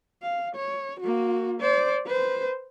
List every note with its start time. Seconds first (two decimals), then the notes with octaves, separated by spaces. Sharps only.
0.23 F5
0.56 C#5
1.00 A#3 F#4
1.60 C5 D5
2.06 B4 C5